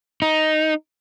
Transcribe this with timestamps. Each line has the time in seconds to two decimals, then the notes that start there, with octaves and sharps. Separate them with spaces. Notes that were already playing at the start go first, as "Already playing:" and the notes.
0.22 D#4